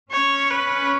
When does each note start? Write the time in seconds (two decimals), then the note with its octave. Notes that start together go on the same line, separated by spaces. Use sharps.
0.12 C#4 C#5
0.51 B4